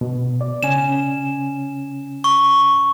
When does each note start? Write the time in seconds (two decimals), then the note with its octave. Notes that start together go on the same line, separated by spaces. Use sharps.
0.01 B2
0.41 D5
0.63 C#3 C#4 G#5 E7
2.24 C#6